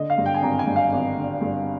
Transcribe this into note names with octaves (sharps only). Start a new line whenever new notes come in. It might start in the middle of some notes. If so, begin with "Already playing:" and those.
Already playing: D3 D#5
F5
G2
G5
G#5
G#1 A#5
G#5
G2
F5
G#1
D3
G2